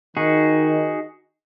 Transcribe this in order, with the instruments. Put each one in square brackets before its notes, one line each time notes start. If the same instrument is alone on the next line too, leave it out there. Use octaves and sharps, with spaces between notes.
[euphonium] D#3 [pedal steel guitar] D#4 F#4 G#4